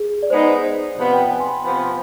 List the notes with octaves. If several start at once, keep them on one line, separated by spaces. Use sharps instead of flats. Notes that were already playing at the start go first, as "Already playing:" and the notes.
Already playing: G#4
D5
G#3 B3 D#4 C5
C3 F3 B3
G5
G#5
C6
B5
C3 F3 B3 B5
B5